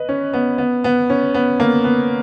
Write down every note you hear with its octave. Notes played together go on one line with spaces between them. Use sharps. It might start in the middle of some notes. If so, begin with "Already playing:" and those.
Already playing: B4 D#5
C#4
B3
B3
B3
C#4
B3
A#3
B3